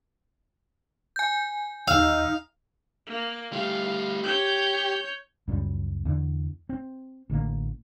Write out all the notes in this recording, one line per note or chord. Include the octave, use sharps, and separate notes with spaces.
G#5 G6
D#2 D#4 F5 E6
A#3
G3 A3 F5
G4 C#5 G6
C#2 F#2 G3
E2 D3
C4
A1 D3 G#3 A#3